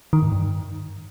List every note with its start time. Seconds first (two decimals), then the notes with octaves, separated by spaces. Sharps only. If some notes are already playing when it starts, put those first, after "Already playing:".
0.13 D#3
0.22 G#2
0.32 G2